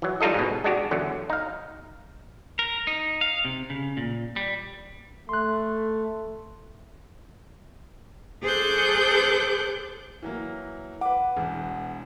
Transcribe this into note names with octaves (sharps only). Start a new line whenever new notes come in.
E3 F#3
G3 D#4 F4 A4 D#5
G#2 B2
G#3 D4 F#4 G4
E2 D3 F#3
D#4 F5
A#4
D#4
F5
C3
C#3
A#2
G3
A3 C6 F#6
G#4 A4 C5 D6 F#6 G6
E3 F#3 A#3
B4 F#5 D6
E1 E2